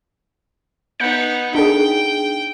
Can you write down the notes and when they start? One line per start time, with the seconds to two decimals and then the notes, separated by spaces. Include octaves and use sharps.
1.00 B3 D#4 G6 C#7
1.55 D4 D#4 G#4 G5